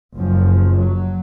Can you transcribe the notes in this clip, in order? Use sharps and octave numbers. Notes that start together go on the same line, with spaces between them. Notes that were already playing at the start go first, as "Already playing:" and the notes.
F#1 F#2 F3
F#3